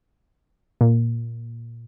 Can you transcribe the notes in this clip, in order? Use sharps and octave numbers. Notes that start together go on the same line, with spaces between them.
A#2